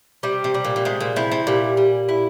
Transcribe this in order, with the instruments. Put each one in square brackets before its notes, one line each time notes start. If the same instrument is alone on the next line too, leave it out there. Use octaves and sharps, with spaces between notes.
[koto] C3 [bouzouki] G3
[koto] C3
[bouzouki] G3
[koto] A#2
A#2
[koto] C3 [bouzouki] G#3
[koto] A#2
[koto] C3 [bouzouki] E4
[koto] C3
[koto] A#2 [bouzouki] G3
[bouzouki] G3
E4